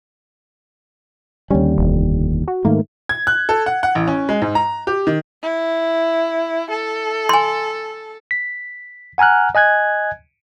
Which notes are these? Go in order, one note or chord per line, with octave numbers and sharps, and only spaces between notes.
D#2 D3 G3 C#4
F1
F#4
G#2 D#3 A3 A#3
G#6
F#6
A4
F#5
F#5
A1
C#4
G#3
G#2
A#5
G4
D#3
E4
A4
G#5 C6
B6
F#5 G#5 A#5 F6 F#6
D#5 G#5 F#6 G#6